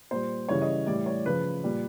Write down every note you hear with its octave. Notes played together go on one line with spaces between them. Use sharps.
A#2 G3 C5
C#3 E3 G3 C#5
D#5
A2 E3 G3 D5
C#5
C#3 F3 B4
A#2 G3